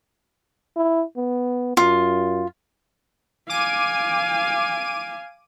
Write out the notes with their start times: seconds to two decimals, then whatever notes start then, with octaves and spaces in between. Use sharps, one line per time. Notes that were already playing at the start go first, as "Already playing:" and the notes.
0.77 E4
1.17 B3
1.77 F#2 F4
3.49 F5 G#5 D6 D#7